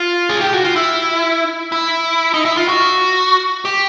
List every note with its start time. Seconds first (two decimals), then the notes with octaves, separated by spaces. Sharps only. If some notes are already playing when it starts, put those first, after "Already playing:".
Already playing: F4
0.29 G#4
0.41 G4
0.53 F#4
0.64 F4
0.76 E4
1.72 E4
2.34 D#4
2.45 E4
2.57 F4
2.69 F#4
3.65 G4